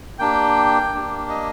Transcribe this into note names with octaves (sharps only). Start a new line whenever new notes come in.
A#3 D4 G4 G5
A#3 D4 G4
D#5